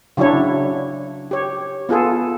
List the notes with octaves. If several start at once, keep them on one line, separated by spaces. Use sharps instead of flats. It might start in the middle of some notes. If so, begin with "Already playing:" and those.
C#3 F#3 D4 E4 C#5
G4 C#5
B3 F4 G#4 A4